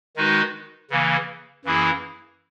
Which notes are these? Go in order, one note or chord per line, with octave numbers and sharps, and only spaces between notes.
D#3 G#3 D#4 F#4 B4
C#3 E3 A#3
F#2 E3 A#3 E4 G#4